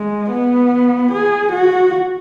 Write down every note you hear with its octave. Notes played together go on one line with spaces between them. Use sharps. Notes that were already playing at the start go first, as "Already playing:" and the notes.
Already playing: G#3
B3
G#4
F#4